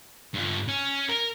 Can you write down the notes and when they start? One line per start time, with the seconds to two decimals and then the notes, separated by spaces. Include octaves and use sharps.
0.34 G2 F4
0.68 C#4
1.09 A#4